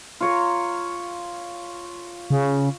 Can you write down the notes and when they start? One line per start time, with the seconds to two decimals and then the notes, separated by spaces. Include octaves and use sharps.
0.21 F4 C#5 A#5
2.30 C#3